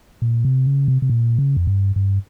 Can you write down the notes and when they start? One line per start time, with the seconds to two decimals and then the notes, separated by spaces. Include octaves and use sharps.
0.22 A#2
0.45 C3
0.66 C#3
0.88 C3
1.02 C3
1.10 A#2
1.39 C#3
1.56 F2
1.67 G2
1.96 G2